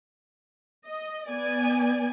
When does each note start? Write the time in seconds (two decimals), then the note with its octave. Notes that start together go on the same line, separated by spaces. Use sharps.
0.87 D#5
1.30 B3 D5 G#5